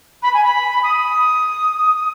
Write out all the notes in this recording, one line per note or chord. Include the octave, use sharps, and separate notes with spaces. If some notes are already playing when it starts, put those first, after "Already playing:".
B5
G#5
B5
D#6